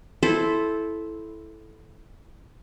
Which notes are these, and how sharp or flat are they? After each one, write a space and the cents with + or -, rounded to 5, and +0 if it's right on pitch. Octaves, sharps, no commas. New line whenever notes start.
E4 +0 A4 -15 C5 +0